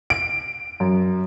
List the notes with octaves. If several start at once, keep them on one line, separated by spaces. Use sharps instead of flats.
D7
F#2